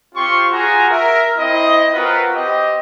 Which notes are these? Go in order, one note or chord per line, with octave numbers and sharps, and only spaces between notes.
C4 F4 G4 C6 C#6
F4 F#4 G#4 G#5 A#5
A#4 E5
C4 E4 D#5
C4 F4 F#4 A#4 B4
C4 G4 D#5